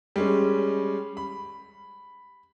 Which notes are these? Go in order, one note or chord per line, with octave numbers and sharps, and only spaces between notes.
G3 G#3 C#4
B5